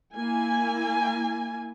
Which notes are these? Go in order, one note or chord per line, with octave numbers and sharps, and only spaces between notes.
A#3 E4 G#5